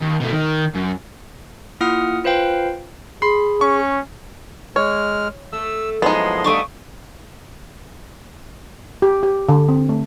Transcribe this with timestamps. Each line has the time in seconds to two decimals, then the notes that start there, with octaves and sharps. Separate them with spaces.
0.02 D#2
0.21 B2 A3
0.33 D#3
0.75 F#2
1.81 A#3 E4 F4 F#5 D#6 F6
2.24 F4 B4 C5 F5 G5
3.22 G#4 B5 C6 C7
3.61 C#4 C#6
4.76 G#3 C#5 F6
5.53 A3 E6
6.02 F#2 A2 F3 G#3 B3 D#4 C6
6.44 G2 A3 D5 C#6 D#6
9.02 G4
9.23 G4
9.49 D3
9.69 C4
9.89 A3